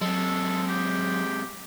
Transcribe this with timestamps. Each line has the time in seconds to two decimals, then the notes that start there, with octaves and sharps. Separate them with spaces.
0.01 C3 F#3 G#3 A4
0.69 G4